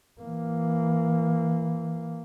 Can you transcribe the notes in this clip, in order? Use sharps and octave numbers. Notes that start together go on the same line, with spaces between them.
E3 A#3